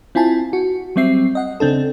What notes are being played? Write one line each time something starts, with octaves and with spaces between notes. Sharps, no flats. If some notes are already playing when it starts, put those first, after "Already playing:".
C4 E4 F4 G#5 A5
F#4
F#3 G3 C4 E5 C7
D#5 F#5
C#3 C4 D4 A4